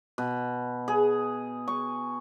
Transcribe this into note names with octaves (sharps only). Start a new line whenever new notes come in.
B2
G#4
C#6